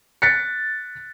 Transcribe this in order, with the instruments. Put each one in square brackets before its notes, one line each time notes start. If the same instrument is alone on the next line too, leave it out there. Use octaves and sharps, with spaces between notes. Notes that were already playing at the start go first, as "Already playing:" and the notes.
[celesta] F#6 [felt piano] A6 B6 C#7